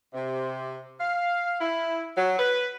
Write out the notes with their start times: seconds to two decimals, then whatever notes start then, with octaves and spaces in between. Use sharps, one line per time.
0.14 C3
1.00 F5
1.61 E4
2.17 F#3
2.39 B4